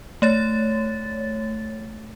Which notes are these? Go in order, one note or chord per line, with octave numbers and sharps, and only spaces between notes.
A3 C#5 A6